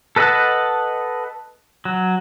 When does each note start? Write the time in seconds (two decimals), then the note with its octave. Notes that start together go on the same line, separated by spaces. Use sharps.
0.16 A4 B4 D#5 F#5 A5
1.85 F#3